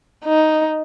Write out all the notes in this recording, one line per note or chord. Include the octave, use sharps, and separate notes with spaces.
D#4